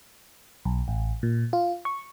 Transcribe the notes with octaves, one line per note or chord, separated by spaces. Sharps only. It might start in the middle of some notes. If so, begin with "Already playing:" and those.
B1
A1
A#2
F4
C#6